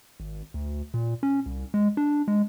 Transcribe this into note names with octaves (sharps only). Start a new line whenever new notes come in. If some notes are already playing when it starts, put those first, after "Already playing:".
G#1
D2
A#2
C#4
C2
G#3
D4
G#3